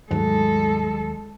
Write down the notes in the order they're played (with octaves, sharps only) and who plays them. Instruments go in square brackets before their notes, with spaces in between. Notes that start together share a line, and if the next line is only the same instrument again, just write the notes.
[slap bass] D#2 F#3 A3 [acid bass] G#2 [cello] G#3 A4